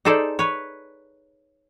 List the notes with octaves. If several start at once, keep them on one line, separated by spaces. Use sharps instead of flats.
D#4 G#4 A4 C5 D5
B4 C#5